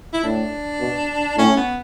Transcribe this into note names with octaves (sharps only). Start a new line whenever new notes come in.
E4
A2 D4
B2
A2 C#4
B3